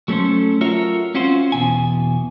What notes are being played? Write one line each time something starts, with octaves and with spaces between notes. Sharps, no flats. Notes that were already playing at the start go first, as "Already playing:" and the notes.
F#3 A3 C#4 A4 C5
F4 F#4 A#4 C#5 E5
C4 C#4 F4 F#4 C5
E2 B2 G#5